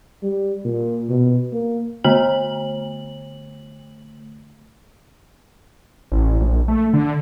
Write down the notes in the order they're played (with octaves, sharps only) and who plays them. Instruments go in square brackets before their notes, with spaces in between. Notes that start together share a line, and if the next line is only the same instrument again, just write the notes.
[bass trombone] G3
A#2
B2
A#3
[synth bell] D3 A3 F#7
[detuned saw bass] A1
A#1
A3
D3